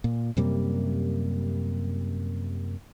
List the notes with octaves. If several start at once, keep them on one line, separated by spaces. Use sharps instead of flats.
A#2
F#2 C3 G3 A#3